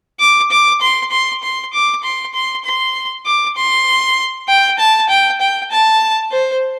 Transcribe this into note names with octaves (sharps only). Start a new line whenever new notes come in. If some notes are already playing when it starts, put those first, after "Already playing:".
D6
D6
C6
C6
C6
D6
C6
C6
C6
D6
C6
G5
A5
G5
G5
A5
C5